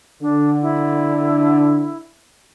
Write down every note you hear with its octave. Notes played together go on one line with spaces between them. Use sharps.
D3 D4
E4